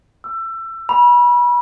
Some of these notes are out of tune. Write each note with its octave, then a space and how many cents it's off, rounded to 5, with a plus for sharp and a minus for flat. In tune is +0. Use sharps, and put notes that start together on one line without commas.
E6 +25
B5 -30